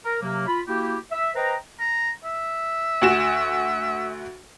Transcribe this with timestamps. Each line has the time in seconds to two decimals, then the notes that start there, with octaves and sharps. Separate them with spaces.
0.05 A#4
0.22 C3 F#3 A#3
0.47 F4 B5
0.68 A#3 E4 F#4 G4
1.12 E5
1.35 B4 C5 D#5 G5 A#5
1.80 A#5
2.24 E5
3.02 D2 F#4 E7